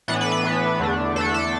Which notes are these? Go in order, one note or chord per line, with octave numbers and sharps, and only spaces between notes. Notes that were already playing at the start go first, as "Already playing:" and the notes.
A2 E3 B3 D4 F#5
B4
B4
A2 E3 B3 D4
E2 D3 A3 D4
E2 D3 A3 D4 A4
A4